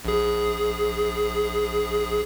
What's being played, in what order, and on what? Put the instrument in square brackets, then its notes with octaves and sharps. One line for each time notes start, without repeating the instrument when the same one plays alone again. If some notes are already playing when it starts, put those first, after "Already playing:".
[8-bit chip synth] A#1 G#4